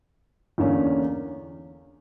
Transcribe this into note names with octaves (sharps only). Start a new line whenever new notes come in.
E2 D3 A#3 C#4